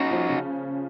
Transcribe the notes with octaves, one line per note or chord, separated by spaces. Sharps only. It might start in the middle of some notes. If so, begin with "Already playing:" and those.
Already playing: C#4 D#4 F#4
F3
C#3